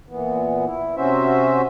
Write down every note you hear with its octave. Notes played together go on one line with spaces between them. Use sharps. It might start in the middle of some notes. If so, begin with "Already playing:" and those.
A#2 E3 B3
E4
C3 C#4 F#4 C5 E5